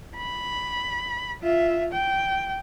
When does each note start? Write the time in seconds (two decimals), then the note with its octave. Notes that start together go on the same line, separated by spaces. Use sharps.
0.16 B5
1.43 F4 E5
1.92 G5